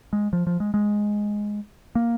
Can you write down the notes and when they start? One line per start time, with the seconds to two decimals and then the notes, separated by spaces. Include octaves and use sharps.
0.13 G#3
0.33 F3
0.47 F3
0.60 G#3
0.74 G#3
1.95 A#3